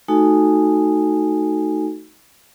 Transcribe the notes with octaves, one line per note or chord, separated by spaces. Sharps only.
A3 D#4 F#4 A4 G#5